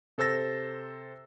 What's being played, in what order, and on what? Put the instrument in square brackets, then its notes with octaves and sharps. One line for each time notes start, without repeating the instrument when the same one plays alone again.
[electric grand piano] C3 A4 C5 E6 A6 A#6